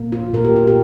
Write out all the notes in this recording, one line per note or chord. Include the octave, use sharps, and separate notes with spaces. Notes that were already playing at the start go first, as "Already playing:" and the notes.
Already playing: A#2 A#3
F4
A#2 A#3 A#4
G4
F4
G4